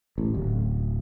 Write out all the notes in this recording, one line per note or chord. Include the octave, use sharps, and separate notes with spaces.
A1
D1